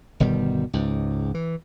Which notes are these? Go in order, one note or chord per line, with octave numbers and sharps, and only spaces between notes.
G1 B2 D#3 G3
C#2 G#2
E3